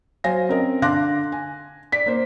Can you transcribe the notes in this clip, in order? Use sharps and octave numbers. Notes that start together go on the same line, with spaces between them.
F#3 C5 F5 G#5 A#6
C4 C#4 A#4 D#5
D3 F5 C6 D6 F#6 A#6
G#5
D5 B6
A#3 C5